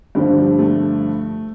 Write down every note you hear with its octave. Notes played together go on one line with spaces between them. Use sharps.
G2 D3 F3 A3
G3
A3